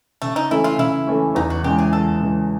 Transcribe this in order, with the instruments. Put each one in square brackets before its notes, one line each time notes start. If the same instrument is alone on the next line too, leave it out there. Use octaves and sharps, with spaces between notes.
[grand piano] C#3 [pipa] A3
[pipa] D#4
[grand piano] E3 A3 C#4 [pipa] E4
[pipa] F4
[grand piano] C#3 [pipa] E4
[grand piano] E3 A3 C#4
[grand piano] E2 [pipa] D#4
[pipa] F#4
[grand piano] C#3 E3 G#3 C#4 [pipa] G4
[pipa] G#4
[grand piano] E2 [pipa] A4
[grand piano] C#3 E3 G#3 C#4